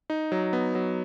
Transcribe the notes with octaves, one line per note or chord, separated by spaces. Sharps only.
D#4
F#3
B3
F#3